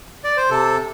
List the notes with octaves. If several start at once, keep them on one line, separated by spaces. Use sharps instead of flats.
D5
C5
C3 A4